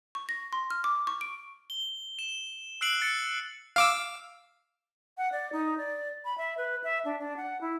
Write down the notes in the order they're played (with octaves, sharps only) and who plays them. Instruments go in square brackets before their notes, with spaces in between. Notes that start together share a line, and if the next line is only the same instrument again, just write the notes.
[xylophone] C#6
A#6
C6
F6
D6
C#6
D7
[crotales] G7
E7
E6 F#6 C7 D7 F#7
E6 A6 C#7
[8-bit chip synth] F5 D6 E6
[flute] F#5
D5
D#4
D5
B5
E5
B4
E5
D4
D4
F#5
E4